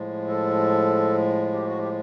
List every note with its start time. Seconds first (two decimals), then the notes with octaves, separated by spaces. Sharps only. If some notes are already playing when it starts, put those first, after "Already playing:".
Already playing: A2 F3 G#3
0.28 A4
1.53 G4
1.66 F#4
1.79 G4